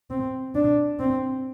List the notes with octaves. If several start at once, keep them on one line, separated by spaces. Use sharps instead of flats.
C4
D4
C4